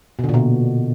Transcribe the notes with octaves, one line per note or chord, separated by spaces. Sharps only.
B2
D3
A#2
B2